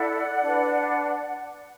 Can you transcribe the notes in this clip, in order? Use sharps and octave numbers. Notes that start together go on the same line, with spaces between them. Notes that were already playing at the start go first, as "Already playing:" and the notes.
Already playing: E4 A4 D5 F#5
D4 B4